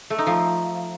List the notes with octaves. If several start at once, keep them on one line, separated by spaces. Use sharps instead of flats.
A3
D#4
F3